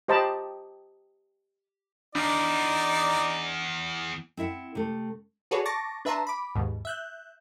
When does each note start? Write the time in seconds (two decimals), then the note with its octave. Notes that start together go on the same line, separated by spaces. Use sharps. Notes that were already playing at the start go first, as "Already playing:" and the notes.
0.08 G4 C5 D#5 G5 A5 B5
2.15 E2 D4 D#4 D5
4.37 C4 E4 E5 F#5
4.75 C3 A3
5.51 F#4 G#4 A4 B4 C#5 D5
5.65 A5 C#6 D6 A6 A#6
6.05 D4 B4 E5 A5 A#5 C6
6.27 B5 D6
6.55 D#2 G#2 B2
6.85 E5 F#6 G6